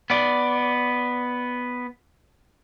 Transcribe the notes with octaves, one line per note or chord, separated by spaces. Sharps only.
B3 D5